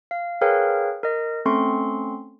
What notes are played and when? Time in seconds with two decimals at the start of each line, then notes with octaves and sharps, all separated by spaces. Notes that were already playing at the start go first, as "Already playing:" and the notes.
0.11 F5
0.41 G#4 A#4 B4 C#5 F5 G5
1.03 A#4 D#5
1.45 A3 C4 C#4 A4 C6 C#6